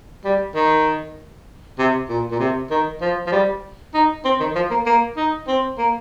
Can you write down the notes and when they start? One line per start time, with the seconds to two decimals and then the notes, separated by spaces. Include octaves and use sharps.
0.25 G3
0.55 D#3
1.79 C3
2.09 A#2
2.31 A#2
2.40 C3
2.71 D#3
3.01 F3
3.27 F3
3.32 G3
3.94 D#4
4.25 C4
4.40 D#3
4.56 F3
4.71 A#3
4.86 A#3
5.17 D#4
5.48 C4
5.78 A#3